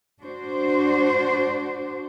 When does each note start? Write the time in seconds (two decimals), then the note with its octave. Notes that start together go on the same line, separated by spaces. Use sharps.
0.23 D4 F#4 C5